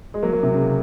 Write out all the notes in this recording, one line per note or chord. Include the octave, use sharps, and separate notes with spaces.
G#3
F#3 A#3
F#3 A#3
C3
C#3